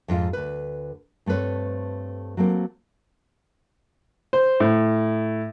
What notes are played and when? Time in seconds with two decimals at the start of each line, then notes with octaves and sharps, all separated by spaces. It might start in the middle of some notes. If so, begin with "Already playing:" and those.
0.08 F2 G#2 F4 F5
0.33 D2 B4
1.26 G2 A3 C4 B4 C#5
2.37 F#3 A3 A#3 C4
4.33 C5
4.60 A2